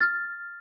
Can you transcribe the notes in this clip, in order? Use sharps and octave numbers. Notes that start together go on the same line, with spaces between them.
F6 A6